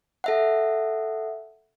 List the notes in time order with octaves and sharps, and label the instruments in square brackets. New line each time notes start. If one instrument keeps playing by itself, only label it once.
[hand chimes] A4 E5 F#5